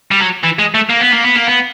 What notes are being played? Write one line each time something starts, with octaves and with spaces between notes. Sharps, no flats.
G3
F#3
E3
G#3
A3
A#3
B3
A#3
B3
A#3
B3